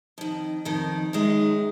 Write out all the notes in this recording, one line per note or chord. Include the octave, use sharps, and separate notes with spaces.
F2 D#3
F2 D#3
F#2 D#3 G#3